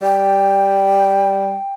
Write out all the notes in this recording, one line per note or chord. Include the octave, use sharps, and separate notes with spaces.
G3 G5